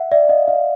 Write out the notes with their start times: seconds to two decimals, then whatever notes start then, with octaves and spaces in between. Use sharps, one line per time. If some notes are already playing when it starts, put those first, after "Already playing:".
Already playing: E5 F#5
0.11 D5 E5
0.29 D#5 F5
0.48 D#5 F5